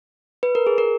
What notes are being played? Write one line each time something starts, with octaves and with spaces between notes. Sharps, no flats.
B4
A#4
G#4
A#4